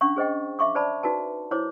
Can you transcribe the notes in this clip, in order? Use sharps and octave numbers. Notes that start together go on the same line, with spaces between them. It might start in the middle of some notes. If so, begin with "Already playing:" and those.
C#4 D4 F5 C#6
G#4 C5 D#5 G5
E5 F5 C#6 D6
C5 D5 A5 B5
D#4 F#4 B4 A5
E4 C5 C#5 D6